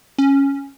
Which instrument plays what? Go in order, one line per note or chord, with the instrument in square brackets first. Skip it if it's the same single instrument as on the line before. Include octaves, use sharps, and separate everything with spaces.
[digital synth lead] C#4